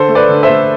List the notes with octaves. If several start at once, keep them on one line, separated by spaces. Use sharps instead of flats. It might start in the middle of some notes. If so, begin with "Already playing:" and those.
Already playing: D3 A4 C5
A3
B4 D5
D3
C5 E5
A3